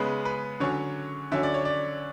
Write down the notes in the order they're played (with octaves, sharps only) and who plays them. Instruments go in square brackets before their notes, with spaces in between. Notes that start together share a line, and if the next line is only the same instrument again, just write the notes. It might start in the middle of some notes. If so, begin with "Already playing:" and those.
Already playing: [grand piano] C#3 G#3 B3 B4
B4
D3 F#3 C#4 C#5
D3 F#3 C#4 E5
D5
C#5
D5